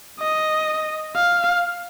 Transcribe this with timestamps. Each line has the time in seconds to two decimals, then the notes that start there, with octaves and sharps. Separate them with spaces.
0.20 D#5
1.15 F5